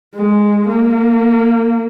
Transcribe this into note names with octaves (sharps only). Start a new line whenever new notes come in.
G#3
A#3